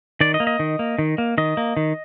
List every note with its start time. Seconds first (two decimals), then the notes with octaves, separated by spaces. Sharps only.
0.21 D#3 D5
0.34 D#5
0.40 A#3
0.47 D#5
0.59 D#3
0.79 A#3
0.99 D#3
1.18 A#3
1.38 D#3 D#5
1.57 A#3
1.77 D#3